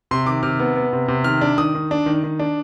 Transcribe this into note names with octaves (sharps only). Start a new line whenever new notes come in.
C3 C6
D#3 D6
C3 F6
B3
B3
C3
C3
D#3 F6
D4
D#3 D#6
D#3
D4
D#3
D#3
D4